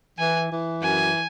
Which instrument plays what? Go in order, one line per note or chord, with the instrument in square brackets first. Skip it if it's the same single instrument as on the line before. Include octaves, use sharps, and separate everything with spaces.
[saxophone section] E3 [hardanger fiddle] G#5
[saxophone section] E3
[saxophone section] F#2 [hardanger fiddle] G#5